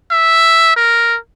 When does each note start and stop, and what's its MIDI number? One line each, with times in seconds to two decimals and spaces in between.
0.11 0.74 76
0.76 1.17 70